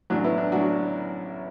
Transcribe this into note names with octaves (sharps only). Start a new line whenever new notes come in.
A1 A2 F#3 D4
B3 E4
D4
A2 F#3 D4 F#4